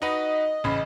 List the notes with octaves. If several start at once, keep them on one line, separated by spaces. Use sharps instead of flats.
D#4 F#4 B4 D#5
A1 C#3 B5